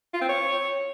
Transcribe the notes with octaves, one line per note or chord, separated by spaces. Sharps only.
F4
C4
C#5